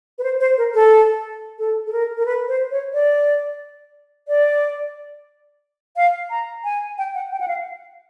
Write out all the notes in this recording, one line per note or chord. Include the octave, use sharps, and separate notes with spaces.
B4
C5
C5
A#4
A4
A4
A4
A#4
A#4
B4
C5
C#5
D5
D5
F5
A#5
G#5
G5
F#5
G5
F#5
F5